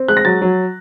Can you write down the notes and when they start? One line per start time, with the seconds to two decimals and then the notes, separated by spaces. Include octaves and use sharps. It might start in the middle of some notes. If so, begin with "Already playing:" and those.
Already playing: C4
0.08 G#3 F#6
0.17 A#6
0.25 F#3 A6
0.42 F#3